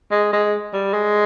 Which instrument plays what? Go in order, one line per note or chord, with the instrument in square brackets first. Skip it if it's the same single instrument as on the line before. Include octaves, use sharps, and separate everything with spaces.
[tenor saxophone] G#3
G#3
G3
G#3